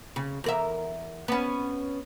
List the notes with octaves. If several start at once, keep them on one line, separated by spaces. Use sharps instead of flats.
C#3
E2 A#4 E5
B3 C#4